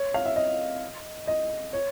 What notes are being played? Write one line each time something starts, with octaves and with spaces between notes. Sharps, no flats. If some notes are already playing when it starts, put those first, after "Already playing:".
Already playing: C#5
F5
E5
D#5
D#5
C#5